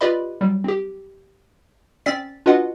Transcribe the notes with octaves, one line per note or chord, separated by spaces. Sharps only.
F4 G4 B4 D5 D#5 B5
F#3 G3
C4 G4
C4 C#4 D5 A6 B6
D4 F4 F#4 B4 D#5 F#5